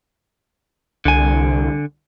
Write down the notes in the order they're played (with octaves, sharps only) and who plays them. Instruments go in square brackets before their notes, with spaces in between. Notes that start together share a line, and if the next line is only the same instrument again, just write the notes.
[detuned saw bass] C2 [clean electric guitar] D3 G#5